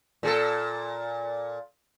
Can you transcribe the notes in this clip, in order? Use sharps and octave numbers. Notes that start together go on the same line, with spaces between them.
A#2 G#4 A4